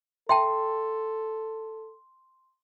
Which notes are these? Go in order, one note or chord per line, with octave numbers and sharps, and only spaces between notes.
A4 E5 G5 A5 C6